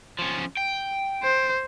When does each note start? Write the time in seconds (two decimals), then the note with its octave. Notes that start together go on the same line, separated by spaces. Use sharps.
0.19 F3 C#4
0.57 G5
1.23 C5